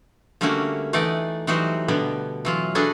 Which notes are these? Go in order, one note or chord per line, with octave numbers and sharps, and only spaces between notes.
D3 G3 A3 A#3 C#4 F#4
E3 A3 D#4 D5 F#5
E3 F#3 G3 D#4 F#4 C5
B2 D3 G3 B3
E3 F#3 F4
D4 F#4 G#4 A4 B4